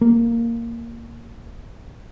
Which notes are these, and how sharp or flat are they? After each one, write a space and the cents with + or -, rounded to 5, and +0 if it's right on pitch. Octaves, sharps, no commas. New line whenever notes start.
A#3 -5